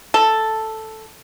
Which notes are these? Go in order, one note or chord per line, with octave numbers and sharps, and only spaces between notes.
A4